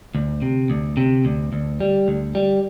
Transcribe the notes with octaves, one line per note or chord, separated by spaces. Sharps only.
D2
C3
D2
C3
D2
D2
G3
D2
G3